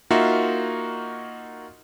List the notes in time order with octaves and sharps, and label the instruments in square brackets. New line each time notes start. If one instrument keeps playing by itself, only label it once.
[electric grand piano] A#3 D#4 F4 F#4 E5